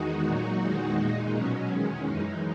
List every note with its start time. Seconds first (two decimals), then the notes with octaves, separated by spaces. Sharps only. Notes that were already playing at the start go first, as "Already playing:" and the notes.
Already playing: E2 D#3 G#3 D#4 F#4
0.27 A#2 F#3 D#4 F#4
0.63 E2 D#3 G#3
0.99 A#2 G#3 D#4
1.35 B2 F#3 C#4
1.72 E2 D#3 G#3 C#4
2.08 F#2 E3 G#3 D#4